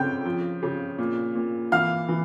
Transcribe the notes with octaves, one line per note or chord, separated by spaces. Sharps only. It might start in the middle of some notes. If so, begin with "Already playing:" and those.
Already playing: C#3 C4 G5 G6
F3
C#3
A#2
A#2
E3 F5 F6
E3